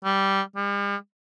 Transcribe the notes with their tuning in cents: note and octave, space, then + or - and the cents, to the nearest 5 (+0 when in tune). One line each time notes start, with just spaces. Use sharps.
G3 -10
G3 +45